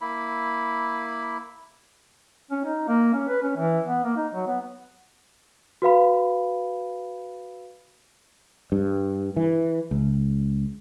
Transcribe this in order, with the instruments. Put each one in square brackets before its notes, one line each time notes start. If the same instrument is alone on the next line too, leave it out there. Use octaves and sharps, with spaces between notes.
[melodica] A#3 E4 B5
[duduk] C#4
D#4
A#3
C#4
B4
C#4
E3
B3
A#3
D#4
F#3
B3
[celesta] F#4 B4 F5 B5
[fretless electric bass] G2
E3
C#2